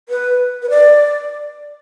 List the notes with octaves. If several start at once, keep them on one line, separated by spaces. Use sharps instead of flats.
B4
B4
D5